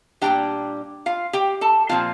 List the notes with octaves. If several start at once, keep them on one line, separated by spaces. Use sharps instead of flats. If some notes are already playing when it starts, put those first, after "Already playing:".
A#2 G3 A#3 D4 G4 G5
F4 F5
G4 G5
A4 A5
A#2 F3 C4 F4 F5